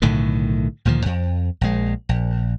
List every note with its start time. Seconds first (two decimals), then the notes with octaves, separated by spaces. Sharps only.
0.02 B1 A2 D3 D#3
0.85 D2 A#2 D#3 F3
1.06 F2
1.61 A#1 G#3
2.09 A#1